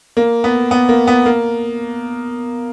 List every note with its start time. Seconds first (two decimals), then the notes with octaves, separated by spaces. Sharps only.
0.17 A#3
0.44 B3
0.71 B3
0.89 A#3
1.07 B3
1.26 A#3